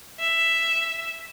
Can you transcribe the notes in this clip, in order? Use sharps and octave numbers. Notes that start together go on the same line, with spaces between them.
E5